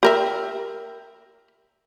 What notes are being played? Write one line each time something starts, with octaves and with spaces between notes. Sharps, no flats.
G4 A#4 E5